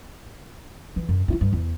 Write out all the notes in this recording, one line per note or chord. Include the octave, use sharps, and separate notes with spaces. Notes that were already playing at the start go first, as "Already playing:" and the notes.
E3
F#2
G2 E4
G2
E2